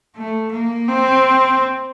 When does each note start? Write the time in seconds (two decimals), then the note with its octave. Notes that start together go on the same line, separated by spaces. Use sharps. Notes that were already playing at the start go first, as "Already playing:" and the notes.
0.16 A3
0.52 A#3
0.89 C4